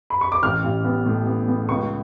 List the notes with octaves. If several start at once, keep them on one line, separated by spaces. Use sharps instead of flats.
B5
C#6
D6
A1 F6
A1
B3
A2
B3
B3
C#2 C#6